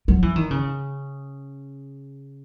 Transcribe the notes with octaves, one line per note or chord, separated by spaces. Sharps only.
F#3
E3
D#3
C#3